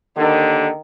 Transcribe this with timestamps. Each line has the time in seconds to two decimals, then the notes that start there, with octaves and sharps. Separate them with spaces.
0.17 D#2 D3 D#3